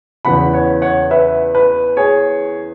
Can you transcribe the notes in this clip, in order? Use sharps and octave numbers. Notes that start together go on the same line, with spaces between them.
E2 C#3 E3 B3 F#5 B5
C#5 F#5
C#5 F#5
B4 E5
B4
G#4 C#5